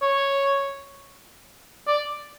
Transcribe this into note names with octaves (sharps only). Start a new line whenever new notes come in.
C#5
D5